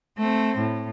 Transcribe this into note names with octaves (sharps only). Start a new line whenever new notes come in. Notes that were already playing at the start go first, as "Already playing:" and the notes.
A3 C4
A2